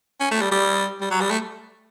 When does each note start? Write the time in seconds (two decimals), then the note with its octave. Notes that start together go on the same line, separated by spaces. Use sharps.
0.20 C#4
0.31 A3
0.41 G3
0.52 G3
1.01 G3
1.11 F#3
1.21 G3
1.30 A3